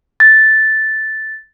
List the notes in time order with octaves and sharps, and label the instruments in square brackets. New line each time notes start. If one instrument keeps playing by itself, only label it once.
[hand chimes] A6